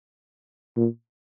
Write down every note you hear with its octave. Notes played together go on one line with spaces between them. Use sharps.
A#2